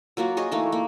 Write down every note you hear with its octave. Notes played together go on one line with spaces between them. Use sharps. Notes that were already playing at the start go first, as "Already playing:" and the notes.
F#3 A#3 F4 F#4
G#4 C#5 D#5
E3 A3 A#3 D#4
A#3